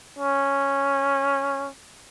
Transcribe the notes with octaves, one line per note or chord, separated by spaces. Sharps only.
C#4